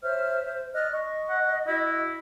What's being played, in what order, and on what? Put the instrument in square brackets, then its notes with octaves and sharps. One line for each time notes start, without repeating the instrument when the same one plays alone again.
[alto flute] C5 [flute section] C#5 E5 F6
[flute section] D5 F6 F#6 [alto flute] D#5
[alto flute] D#5 [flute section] C#6
[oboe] F#5
[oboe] E4 [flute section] F#4